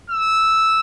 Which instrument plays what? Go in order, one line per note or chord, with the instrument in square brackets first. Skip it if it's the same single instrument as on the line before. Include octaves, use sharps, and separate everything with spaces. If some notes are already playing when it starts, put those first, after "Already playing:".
[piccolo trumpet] E6